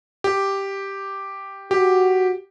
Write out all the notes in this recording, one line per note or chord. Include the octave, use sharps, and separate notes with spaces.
G4
F#4 G4